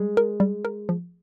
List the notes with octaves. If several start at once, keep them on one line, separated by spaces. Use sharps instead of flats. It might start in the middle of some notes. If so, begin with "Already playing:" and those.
Already playing: G3 G#3
A#4
G3
A#4
F3